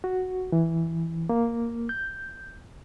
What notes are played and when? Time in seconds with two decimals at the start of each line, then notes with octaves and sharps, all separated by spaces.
0.04 F#4
0.52 E3
1.29 A#3
1.89 G6